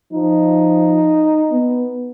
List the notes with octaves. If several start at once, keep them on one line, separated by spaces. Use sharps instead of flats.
F3 D#4
B3